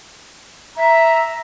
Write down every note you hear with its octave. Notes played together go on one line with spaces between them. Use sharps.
E5 A#5